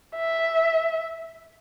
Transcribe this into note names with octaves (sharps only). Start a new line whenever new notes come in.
E5